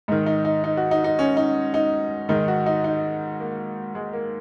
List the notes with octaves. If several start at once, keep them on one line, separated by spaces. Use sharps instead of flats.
G#2 D#3 D#4
D#4
D#4
D#4
F#4
D#4
D#4
C#4
D#4
D#4
G#2 D#3 D#4
F#4
D#4
D#4
A#3
G#3
A#3